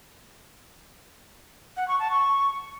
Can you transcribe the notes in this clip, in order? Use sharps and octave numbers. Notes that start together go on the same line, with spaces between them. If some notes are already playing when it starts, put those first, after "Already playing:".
F#5
C#6
A5
C#6